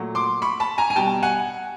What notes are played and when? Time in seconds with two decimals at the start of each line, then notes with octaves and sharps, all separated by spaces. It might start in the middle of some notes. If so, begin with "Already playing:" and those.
Already playing: A#2 F#3 A3
0.15 C6 D6
0.42 B5 C#6
0.60 A5 B5
0.78 G#5 A#5
0.90 G#5
0.96 B2 G3 G5 A5
1.23 F#5 G#5